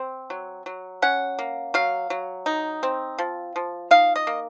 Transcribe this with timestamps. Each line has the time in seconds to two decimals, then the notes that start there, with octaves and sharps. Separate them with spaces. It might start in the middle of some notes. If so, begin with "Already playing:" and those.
Already playing: C4
0.30 F#3
0.66 F#3
1.02 C#4 F#5
1.39 A#3
1.74 F#3 F5
2.10 F#3
2.46 D#4
2.83 C4
3.18 F3
3.56 F3
3.91 D#4 F5
4.16 D#5
4.27 A#3